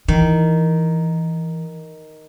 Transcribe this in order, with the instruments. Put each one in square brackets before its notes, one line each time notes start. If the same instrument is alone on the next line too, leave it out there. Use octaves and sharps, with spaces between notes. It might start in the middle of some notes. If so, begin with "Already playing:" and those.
[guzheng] D#3 [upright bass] E3